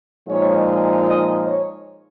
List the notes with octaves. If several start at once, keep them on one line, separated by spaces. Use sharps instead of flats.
A#2 F3 G#3 D#4 C#5
D#5
C#5